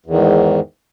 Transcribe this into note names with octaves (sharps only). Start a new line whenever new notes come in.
E2 G#2 D#3